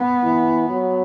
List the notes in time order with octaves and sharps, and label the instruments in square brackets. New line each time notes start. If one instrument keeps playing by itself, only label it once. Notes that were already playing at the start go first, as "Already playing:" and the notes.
Already playing: [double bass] B3
[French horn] E3
F#3